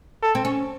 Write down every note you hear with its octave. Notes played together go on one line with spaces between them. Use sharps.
A4
C4
C#4